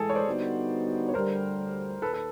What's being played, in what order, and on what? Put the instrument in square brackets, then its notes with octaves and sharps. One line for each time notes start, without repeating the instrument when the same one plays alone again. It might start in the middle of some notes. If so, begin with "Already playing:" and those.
Already playing: [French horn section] A2 E3 G#3 [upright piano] G#4 A4
[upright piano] C#5
C5 D5
[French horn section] D3 G3 B3 D#4 F#4
[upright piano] C#5
[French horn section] D2 D3 G3 [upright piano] A#4 C5
[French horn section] D#2 [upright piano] A4 B4
[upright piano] A4